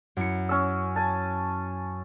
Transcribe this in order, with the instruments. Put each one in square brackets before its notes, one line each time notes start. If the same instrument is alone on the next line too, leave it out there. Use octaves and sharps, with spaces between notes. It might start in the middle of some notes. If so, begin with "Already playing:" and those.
[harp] F#2 E4 C#7
[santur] C#4 E6
G#5 A5